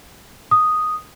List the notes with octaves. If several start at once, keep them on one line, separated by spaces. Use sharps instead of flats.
D#6